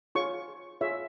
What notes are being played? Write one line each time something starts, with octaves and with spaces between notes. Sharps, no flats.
F4 G#4 C#5 C#6
F4 G#4 C#5 E5